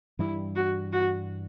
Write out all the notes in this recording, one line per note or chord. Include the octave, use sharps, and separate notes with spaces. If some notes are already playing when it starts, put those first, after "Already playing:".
G2 E3 G3 E4
F#4
F#4